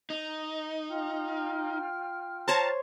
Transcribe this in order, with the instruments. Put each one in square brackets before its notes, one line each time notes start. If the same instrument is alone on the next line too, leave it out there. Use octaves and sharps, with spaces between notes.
[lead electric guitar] D#4
[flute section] F4 G5 F6
[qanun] C5 C#5 [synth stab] A5 A#5